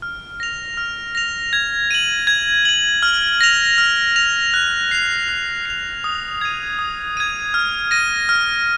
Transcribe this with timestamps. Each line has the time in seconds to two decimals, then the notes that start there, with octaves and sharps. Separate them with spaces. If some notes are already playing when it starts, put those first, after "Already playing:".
0.02 F6
0.40 A#6 F7
0.77 F6
1.15 A#6 F7
1.53 G#6
1.91 D#7 F#7
2.27 G#6
2.65 D#7 F#7
3.03 F6
3.41 A#6 F7
3.78 F6
4.16 A#6 F7
4.54 F#6
4.91 C7 F7
5.29 F#6
5.66 C7 F7
6.04 D#6
6.41 G#6 D#7
6.79 D#6
7.17 G#6 D#7
7.54 F6
7.91 A#6 D#7
8.29 F6